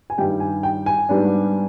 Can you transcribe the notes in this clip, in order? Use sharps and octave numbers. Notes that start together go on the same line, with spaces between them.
G#5
G2 D#3 G3 G5
G#5
G5
G#5
G#2 G3 B3 D4